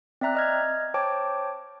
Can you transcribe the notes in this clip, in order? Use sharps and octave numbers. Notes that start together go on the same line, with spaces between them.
C4 D5 E5 A#5 F#6
D#5 F6 G#6
C5 C#5 G5 A5 D6